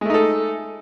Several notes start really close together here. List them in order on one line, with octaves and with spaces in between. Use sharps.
G#3 A3 D#4 A4